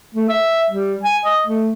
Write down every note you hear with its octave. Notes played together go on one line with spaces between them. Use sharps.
A3
E5
G3
G#5
D#5
A3